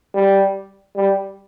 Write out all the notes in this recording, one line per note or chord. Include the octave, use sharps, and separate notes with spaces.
G3
G3